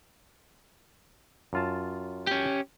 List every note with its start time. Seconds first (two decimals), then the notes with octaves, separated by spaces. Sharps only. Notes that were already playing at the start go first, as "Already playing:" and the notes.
1.53 F#2 F4 A5
2.27 C#4 G4